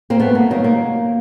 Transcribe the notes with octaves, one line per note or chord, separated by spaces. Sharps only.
A#3 C4
A3 B3
A#3
C3 D#3 F#3 A#3
A#3